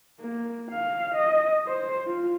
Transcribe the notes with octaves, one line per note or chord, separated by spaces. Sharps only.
A#3
F5
D#5
C5
F4